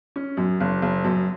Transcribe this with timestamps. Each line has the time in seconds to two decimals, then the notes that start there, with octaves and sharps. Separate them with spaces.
0.16 C#4
0.37 F#2
0.60 F#1
0.82 F#1
1.04 F#2